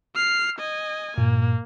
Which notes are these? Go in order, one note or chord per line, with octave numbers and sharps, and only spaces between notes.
F6 C7
D#5 G#5
G2 A#2 A#3